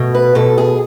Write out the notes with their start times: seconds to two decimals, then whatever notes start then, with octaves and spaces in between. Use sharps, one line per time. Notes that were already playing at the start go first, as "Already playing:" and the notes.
Already playing: B2 A3
0.14 B4
0.35 B2 A4
0.58 G#4